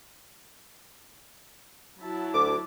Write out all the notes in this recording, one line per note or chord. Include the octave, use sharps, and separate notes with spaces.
F#3 E4 A5
D2 D6